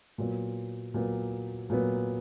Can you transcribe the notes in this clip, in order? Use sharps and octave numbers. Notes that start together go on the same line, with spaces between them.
A#2 F#3 B3
A#2 F#3 B3
A#2 F#3 B3